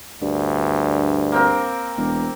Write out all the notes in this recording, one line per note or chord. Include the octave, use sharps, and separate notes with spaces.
D2 G2
A#3 C4 A#4
E1